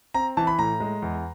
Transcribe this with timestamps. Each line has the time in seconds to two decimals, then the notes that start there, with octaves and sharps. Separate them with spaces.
0.14 C4 A#5
0.37 E3 A5
0.47 B5
0.59 A2 A#5
0.80 G#3
1.02 E2